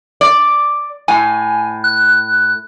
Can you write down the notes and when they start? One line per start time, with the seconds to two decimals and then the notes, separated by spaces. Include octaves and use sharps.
0.21 D5
1.08 A2 G#5
1.84 F#6